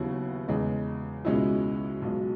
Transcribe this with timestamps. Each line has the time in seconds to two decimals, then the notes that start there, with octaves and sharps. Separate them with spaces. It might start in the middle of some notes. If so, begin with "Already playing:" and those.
Already playing: D#2 C#3 F#3 B3 E4
0.48 E2 C#3 G#3
1.25 C#2 B2 G#3 C#4 E4
2.02 B1 B2 G#3